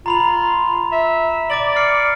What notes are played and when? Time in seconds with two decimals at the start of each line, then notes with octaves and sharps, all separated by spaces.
0.06 F4 A#5 B5 F7
0.92 E5
1.50 D5 D6 A6 F#7
1.76 F6 C7 C#7